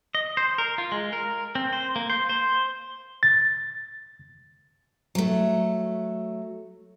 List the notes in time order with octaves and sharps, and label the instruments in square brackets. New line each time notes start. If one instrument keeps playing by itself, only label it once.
[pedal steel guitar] D#5
C5
A#4
F4
G#3
A#4
C4
C5
A#3
C5
C5
[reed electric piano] A6
[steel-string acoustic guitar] F#3 A3